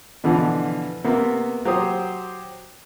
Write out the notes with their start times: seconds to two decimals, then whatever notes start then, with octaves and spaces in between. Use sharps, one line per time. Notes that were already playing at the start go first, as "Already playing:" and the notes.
0.24 B2 D3 E3 F3
1.04 C3 A#3 B3
1.65 F#3 G4 C5 D#6